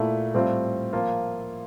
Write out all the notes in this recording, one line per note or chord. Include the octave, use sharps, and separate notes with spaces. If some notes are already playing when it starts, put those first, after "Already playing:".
Already playing: A#2 A3 E4
A2 G3 C4 F4
F3 A#3 F4